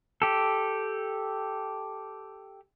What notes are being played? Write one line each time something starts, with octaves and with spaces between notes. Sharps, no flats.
G4 A4